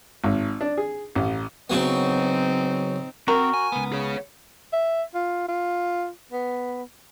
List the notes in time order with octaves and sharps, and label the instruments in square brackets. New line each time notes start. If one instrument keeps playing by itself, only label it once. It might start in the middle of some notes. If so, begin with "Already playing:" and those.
[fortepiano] G#1
D4
G#4
A1
[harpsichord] C#3 F#3 B3 [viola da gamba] C4 D#4
[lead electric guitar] C4 [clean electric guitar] F#4 [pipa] A#4
[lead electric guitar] G#5
[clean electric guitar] C#2 B3
[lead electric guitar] G#4 C#5
[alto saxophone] E5
F4
F4
B3